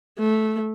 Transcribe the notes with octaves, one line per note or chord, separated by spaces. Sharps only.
A3